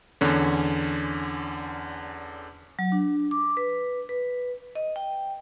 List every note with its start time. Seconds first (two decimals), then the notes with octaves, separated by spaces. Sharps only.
0.21 E2 D3 C#4
2.79 F#3
2.92 D4
3.31 D6
3.57 B4
4.09 B4
4.75 D#5
4.96 G5